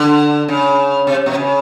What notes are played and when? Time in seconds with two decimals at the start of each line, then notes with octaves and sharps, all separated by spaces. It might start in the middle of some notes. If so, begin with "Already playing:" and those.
Already playing: D3
0.48 C#3
1.07 C3
1.26 B2
1.36 C#3